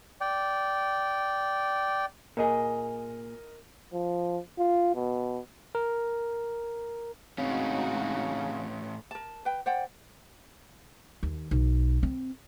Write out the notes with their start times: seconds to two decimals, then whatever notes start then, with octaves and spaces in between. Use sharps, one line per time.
0.21 D5 G5
2.37 A#2 G#4 A#4 D#5
3.94 F3
4.58 F4
4.95 B2
5.75 A#4
7.38 A2 C#3 G#3 C4 C#4 D#4 F#4
9.11 A#4 A5
9.45 B4 G5
9.66 C5 D5 F#5 G5
11.23 D#2
11.51 B1
12.03 C4